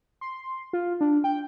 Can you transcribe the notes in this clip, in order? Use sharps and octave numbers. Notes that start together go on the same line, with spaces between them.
C6
F4
D4
G5